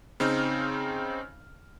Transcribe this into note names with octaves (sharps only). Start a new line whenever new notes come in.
C#3 C4 D#4 F6